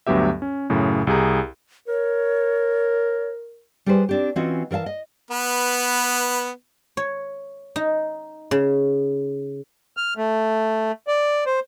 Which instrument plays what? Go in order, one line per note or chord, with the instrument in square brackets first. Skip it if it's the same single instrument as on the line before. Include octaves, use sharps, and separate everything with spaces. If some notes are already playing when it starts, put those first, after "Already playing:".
[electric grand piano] D2 G2 F#3 B3 G4 E5
C#4
F#2 A2 C#3
C2 G4 G#4 A#5
[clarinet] A#4 [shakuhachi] C#5
[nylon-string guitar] G3 G4 G#4 B4 C5
C4 D4 G4
E3 C4 C#4 F4 F#4 D#5
E3 A#4 D5 F5 A5
D#5
[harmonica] B3 B4
[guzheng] C#5
D#4
C#3
[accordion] F6
A3
D5
C5